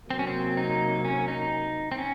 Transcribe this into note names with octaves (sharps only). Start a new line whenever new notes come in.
C3 F#3 A#3 C4
C#4
C4
D#4
C#4
D#4
C4
C#4